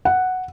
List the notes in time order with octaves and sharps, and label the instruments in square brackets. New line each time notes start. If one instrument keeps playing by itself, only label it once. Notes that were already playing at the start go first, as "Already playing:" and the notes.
[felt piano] F#5